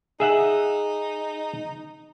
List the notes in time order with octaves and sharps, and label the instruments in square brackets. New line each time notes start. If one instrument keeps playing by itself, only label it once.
[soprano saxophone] D#4 [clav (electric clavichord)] G#4 E5 F#5